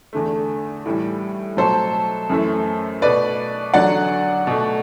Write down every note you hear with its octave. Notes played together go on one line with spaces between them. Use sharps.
E2 D3 A3
A2 E3 G3
B2 F#3 A3 A4 C5
F#2 E3 A3
B2 A3 B4 D5
E2 D3 F#3 D5 F#5
B2 A3